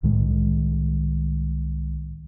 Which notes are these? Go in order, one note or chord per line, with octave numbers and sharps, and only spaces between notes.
C2 A2 D#3 G#3